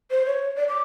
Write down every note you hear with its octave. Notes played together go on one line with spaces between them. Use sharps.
C5
C#5
D5
D6